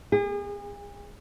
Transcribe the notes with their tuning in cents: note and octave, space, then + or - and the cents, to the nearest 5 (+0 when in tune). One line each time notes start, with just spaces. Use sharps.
G#4 -40